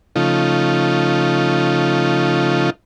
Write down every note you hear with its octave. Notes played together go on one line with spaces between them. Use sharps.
C#3 F3 A3 D#4 F4